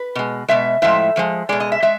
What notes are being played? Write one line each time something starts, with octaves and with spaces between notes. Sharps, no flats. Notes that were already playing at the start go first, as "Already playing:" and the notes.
Already playing: B4
B2 G#3
B2 G#3 E5
A2 F3 G#3 E5
A2 F3 G#3
B2 G#3 D5
D#5
E5
G#3 E5